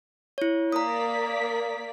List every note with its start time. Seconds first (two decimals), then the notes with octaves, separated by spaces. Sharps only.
0.38 E4 C#5
0.72 A#3 D5 A#5 D#6 B6